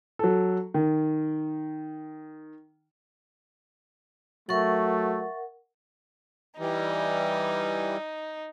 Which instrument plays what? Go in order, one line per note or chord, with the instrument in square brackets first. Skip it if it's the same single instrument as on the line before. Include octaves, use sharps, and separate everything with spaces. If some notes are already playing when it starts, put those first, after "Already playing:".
[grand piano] F#3 A4
D#3
[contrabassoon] F#3 [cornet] A3 [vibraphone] A#4 F#5 [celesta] E5 C#6 A6
[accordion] E3 G3 [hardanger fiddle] D#4